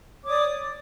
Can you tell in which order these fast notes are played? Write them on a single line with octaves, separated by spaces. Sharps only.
C#5 D6 D#6 D5